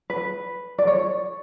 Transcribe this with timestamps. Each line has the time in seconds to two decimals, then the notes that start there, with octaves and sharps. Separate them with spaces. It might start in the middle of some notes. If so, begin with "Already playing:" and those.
0.10 B4
0.78 D5
0.87 C#5